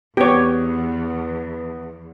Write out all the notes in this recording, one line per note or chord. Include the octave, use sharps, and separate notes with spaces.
E2 B3 G4 C#5